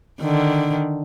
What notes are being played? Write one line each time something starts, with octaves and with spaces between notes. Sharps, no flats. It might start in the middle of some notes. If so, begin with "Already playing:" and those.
D3 D#3